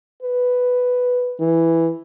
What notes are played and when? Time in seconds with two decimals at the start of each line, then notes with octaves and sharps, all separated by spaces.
0.23 B4
1.40 E3